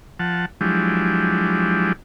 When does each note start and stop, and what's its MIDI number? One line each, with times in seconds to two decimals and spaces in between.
0.19 0.46 53
0.19 0.46 78
0.19 0.46 81
0.61 1.93 53
0.61 1.93 54
0.61 1.93 56
0.61 1.93 62
0.61 1.93 64
0.61 1.93 67